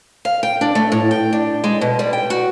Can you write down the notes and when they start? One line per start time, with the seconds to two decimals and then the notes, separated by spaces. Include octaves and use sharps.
0.25 F5
0.43 G5
0.61 D4
0.75 A3
0.92 A2
1.11 G5
1.33 D4
1.64 G#3
1.81 B2
1.99 G3
2.13 G5
2.30 F#4